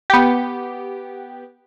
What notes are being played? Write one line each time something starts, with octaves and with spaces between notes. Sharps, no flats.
B3 G4